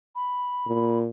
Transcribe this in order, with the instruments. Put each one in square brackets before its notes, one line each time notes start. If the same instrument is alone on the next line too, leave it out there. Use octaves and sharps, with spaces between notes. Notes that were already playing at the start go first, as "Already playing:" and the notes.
[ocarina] B5
[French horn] A#2